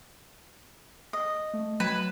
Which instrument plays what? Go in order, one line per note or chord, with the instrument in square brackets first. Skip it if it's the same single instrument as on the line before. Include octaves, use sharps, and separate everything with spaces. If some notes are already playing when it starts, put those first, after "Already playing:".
[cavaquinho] D#5
[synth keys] A3
[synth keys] F#3 G#6 E7 [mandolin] B4